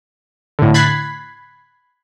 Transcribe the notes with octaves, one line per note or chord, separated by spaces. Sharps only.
A2 D3
B5 F#6 G#6 A6 B6 C7